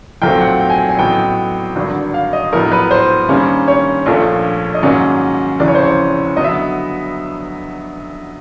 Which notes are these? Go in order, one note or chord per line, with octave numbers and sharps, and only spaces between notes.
B1 A#2 F#3 A3 C4 G5
F#5
G5
G#5
G#5
A1 A2 F#3 B3 G5
G#1 G2 D3 F#3
F5
D#5
A#1 A2 F#3 B3 A#4
B4
C5
G2 D#3 G3 A#3 C#4
C#5
A#1 A#2 F3 A3 D4
D#5
G#2 D#3 F#3 A#3 C#4 D5
F1 E2 C#3 E3 D5
C#5
C5
C#5
D3 F#3 B3 D#5
E5